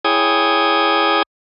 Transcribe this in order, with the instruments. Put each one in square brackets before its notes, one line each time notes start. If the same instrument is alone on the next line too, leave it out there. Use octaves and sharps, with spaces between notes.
[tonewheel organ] E4 G#4 C#5 G5 G#5 D#6